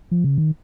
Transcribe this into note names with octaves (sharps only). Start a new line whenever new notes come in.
F3
C#3
D#3